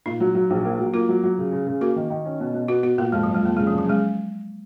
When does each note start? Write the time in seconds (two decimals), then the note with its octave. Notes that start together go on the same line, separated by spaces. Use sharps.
0.06 A#2 D#4
0.20 F#3
0.35 F#3
0.50 A#1
0.65 A#3
0.79 F#3
0.93 A#3 F4
1.09 F#3
1.23 F#3
1.38 C#3
1.52 C#3
1.67 C#3
1.81 A#3 F#4
1.96 D#3
2.10 D#3
2.25 C#4
2.40 B2
2.54 B2
2.68 B3 F#4
2.83 B3 F#4
2.98 A#2 A#3
3.12 F2 G#3
3.23 F#3
3.28 F2
3.34 G#3
3.43 F2 A#3
3.56 C#3 G#3
3.67 F3
3.72 C#3
3.78 F#3
3.86 C#3 G#3